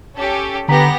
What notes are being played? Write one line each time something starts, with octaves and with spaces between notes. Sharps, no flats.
C#4 G4 A4
D3 B3 G4 A#5 A#6 B6